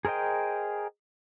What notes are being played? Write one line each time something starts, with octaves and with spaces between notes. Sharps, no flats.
G#4 A#4 C5 D#5 G5